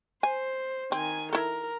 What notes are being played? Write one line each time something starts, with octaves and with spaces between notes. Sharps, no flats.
C5 G#5
D#3 C4 G#5
E4 A4 A#4